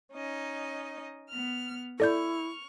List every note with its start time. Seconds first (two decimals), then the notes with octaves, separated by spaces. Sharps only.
0.13 C#4 D#4 D#5
1.29 B3 F6
2.00 E4 A4 D5 C#6 F6 G6